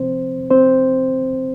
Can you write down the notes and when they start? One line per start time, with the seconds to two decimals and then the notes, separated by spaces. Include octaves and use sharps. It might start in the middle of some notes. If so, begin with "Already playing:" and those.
Already playing: C3 F3 C4 C5
0.51 C4 C5